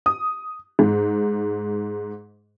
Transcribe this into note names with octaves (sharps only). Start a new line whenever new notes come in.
D#6
G#2